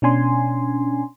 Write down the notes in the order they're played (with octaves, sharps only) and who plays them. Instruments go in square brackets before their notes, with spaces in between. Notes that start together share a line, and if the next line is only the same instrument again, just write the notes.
[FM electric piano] B2 C#4 D4 G#5 C6